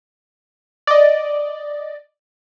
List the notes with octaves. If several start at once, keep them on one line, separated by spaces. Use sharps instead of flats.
D5 D#5